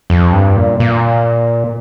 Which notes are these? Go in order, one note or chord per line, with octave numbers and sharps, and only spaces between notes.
F2
G2
A#2
A#2